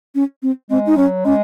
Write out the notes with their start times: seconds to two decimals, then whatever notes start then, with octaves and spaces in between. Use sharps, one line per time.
0.15 C#4
0.43 C4
0.70 G#3 C4
0.86 D#4
0.97 F#3 C#4
1.25 G#3 C#4